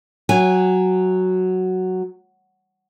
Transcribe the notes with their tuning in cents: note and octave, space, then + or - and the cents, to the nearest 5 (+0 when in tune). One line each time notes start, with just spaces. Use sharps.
F#3 +0 G#5 -20